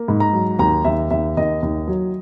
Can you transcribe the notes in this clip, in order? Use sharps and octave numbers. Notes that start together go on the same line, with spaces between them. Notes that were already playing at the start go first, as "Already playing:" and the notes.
Already playing: A#3
G#2
A#5
F#3
D#2 A#5
D#2 E5
D#2 E5
D#2 D#5
D#2
F#3